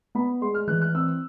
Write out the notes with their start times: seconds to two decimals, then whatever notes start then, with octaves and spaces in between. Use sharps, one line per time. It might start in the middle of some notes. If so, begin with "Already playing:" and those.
0.15 B3 B5
0.41 G#3 C6
0.54 F6
0.67 E3 F#6
0.82 F#6
0.95 C4 E6